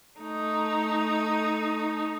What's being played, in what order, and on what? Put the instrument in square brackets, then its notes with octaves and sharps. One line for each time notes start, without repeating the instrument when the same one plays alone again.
[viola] A3 D#4